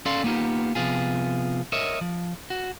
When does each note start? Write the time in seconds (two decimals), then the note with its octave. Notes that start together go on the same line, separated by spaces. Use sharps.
0.06 C#4 A4 D5 F5 C6
0.24 A#3 B3 D#4 F4 G4
0.75 C3 F3 B3 F4 G#4
1.72 A#4 C#5 D#5 E5
2.01 F3
2.50 F#4